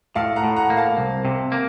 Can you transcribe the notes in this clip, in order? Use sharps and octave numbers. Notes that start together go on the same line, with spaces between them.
A2 F5 A5
F#5 A#5
A2
F#5 A#5
A#3
F5 A5
C2
C3
A#3